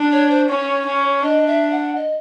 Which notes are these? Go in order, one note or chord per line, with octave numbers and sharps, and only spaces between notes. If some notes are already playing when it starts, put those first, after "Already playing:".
Already playing: D4
C#5
C5
C#4 C#5
C#4
D4 D#5
E5
F#5
D#5